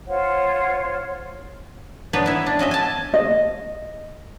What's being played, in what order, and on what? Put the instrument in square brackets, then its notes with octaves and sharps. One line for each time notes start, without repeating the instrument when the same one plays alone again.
[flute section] F4 C5 C#5 F#5
[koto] B3 D4 D#4 B4 C#5
E4 E5
D4
C#4 F#4 D#5 E5
G#5 A5
[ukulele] D#5